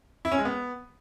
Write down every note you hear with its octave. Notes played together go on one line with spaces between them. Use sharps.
E4
C#4
G#3
B3